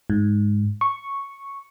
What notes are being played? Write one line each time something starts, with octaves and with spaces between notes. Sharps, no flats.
G#2
C#6